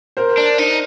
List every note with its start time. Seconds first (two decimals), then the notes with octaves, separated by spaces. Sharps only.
0.17 A#4 C5
0.38 D4
0.59 D#4